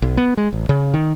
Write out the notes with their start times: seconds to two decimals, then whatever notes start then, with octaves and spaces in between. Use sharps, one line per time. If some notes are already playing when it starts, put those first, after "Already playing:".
0.02 B1
0.17 B3
0.37 G#3
0.53 A1
0.69 C#3
0.94 D#3